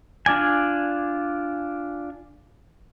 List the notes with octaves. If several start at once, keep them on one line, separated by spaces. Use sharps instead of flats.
D4 F4 D5 G#5